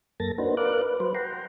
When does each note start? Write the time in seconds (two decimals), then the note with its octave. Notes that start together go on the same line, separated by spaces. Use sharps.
0.20 F#2 A#3 A4 A6 A#6
0.38 A#3 D4 D#4 F#4 B4 C5
0.57 A#4 B4 D5 F5 D6 F#6
0.82 B4
1.00 F#3 B4 C5
1.15 F#5 G5 A#5 C6